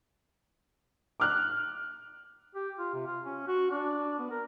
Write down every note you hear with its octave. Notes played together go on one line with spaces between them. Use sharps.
D6 F6 F#6
G4
F4
C3
F4
C#4
F#4
D4
B3
A#4